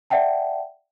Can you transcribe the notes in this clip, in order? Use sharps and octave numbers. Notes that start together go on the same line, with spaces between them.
D5 E5 F#5 G5 A5